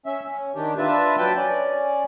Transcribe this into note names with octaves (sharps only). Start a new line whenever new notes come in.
C#4 E5
C#4
D#3 D4 G4
D4 F4 B4 E5 A5
F#3 B4 G5 A5
C#4 D5